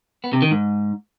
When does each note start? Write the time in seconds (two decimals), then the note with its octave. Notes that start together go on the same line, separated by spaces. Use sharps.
0.24 B3
0.33 C3
0.42 D#3
0.51 G#2